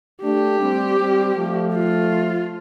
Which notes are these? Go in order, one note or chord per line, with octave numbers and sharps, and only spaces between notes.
A3 D4 G4
G3 C4
G3 C4
F3 A3
F4